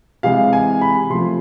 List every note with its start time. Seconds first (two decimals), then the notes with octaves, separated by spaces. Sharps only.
0.23 C3 E3 G#3 F5
0.53 G#5
0.81 B5
1.10 C3 F3 A3 C6